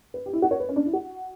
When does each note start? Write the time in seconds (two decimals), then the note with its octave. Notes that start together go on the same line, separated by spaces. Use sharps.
0.14 B4
0.26 G4
0.33 E4
0.42 F#4
0.51 C#5
0.60 B4
0.69 C#4
0.76 D4
0.86 E4
0.93 F#4